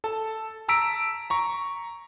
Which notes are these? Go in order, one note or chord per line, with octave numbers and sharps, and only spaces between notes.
A4 A5
A5 A#5 E6 B6 D7
A#5 C#6